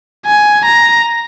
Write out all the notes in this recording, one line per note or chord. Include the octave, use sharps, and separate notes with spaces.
G#5
A#5